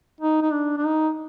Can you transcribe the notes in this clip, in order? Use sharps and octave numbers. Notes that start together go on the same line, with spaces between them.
D#4
D#4
D4
D4
D#4